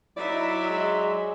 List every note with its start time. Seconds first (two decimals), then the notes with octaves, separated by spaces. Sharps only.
0.17 F#3 D#4 E4 D5 E5
0.70 G#3